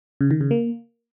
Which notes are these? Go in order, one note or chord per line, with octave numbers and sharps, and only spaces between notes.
C#3
D#3
C#3
A#3